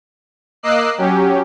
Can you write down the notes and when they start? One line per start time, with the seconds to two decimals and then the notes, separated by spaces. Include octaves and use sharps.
0.63 A#3 D#5 D6 E6 F#6 C7
0.98 F#3 C#4 G4